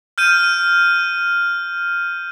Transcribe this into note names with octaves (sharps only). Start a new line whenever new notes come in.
F6 G6 D#7